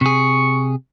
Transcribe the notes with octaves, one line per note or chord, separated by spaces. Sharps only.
C3 G#4 C#6